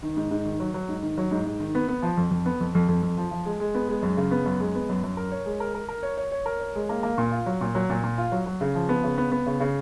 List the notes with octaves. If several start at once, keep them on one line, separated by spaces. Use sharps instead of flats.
D#3
G#2
G#2
D#3
F#3
F#3
G#2
D#3
F#3
G#2
G#2
D#3
B3
B3
F3
F2
F2
B3
F2
F2
F2
F2
F3
F3
G#3
G#3
B3
G#3
F#2
C#3
B3
F#2
G#3
B3
F#2
F#2
A#4
C#5
G#3
A#4
A#4
A#4
C#5
C#5
C#5
A#4
C#5
G#3
A#3
A#3
A#2
F4
F#3
A#2
F#3
A#2
A#2
F4
F#3
F#3
C#3
F3
B3
C#3
B3
B3
C#3
C#3